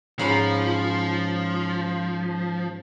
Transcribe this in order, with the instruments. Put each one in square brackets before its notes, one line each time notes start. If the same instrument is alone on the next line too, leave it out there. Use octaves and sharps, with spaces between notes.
[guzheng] G#2 C#4 B5 [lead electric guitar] F3